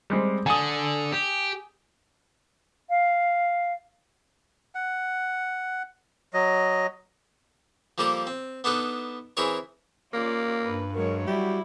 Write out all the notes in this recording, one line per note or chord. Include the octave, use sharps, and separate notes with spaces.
G3 G#3 C4
D3 G#5 D#6
G4
F5
F#5
F#3 D#5
F3 G3 A#3 A4 A#4 D5
C4
B3 D4 D#4 A4 B4
E3 C4 E4 G#4 A#4 C#5
A#3 C#4 F4 D5
G2 B4
F#3 G#3 A#4 C#5
G3 E4 F#4 G4